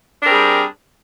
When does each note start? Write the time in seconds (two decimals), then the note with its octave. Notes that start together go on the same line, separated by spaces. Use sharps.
0.22 D4
0.24 C4
0.27 A#4
0.29 G#4
0.32 G3